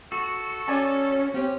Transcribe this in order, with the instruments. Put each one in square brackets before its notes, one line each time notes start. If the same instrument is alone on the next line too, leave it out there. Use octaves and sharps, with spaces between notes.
[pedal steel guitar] F#4 [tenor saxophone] A4
[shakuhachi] C#4 [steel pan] D5 G#5 A5
[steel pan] C4 [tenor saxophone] C#4 [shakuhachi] G4